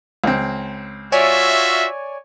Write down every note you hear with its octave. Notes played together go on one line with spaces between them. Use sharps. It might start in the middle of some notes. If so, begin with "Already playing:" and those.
C#2 C4
F4 F#4 C#5 D5 E5 G#5